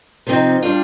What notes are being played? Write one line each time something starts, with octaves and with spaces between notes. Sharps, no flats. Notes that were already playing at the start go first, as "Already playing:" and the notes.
C3 F3 C4 D#4
G3 D4 F4